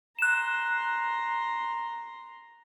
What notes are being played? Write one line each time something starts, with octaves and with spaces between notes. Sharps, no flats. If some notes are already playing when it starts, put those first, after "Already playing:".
A#5 C6 F#6 E7